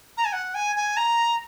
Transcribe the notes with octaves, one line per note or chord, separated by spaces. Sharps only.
A#5
G#5
F#5
G#5
G#5
A#5